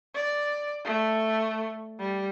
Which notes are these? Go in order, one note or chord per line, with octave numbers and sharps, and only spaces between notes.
D5
A3
G3